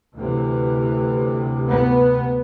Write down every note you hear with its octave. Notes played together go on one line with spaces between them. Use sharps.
D2 C3 E3
B3